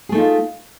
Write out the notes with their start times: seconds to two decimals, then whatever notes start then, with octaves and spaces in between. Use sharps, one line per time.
0.09 G#4
0.12 A3
0.15 D#4
0.18 F4